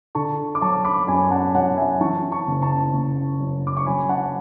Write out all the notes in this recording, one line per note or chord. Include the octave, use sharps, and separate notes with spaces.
D3 A5 C#6
D6
F#3 A5 C#6
B5 D6
F#2 G#5 B5
F#5 A5
F#3 F#5 A5
E5 G#5
E3 A5 C#6
A5 C#6
F#1
A5 C#6
F#1
F#2
D6
C#6
F#3 G#5 B5
F#5 A5